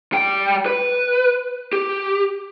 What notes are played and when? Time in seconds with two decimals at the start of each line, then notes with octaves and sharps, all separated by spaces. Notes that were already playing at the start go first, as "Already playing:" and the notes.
0.12 G3 G5
0.66 B4
1.73 G4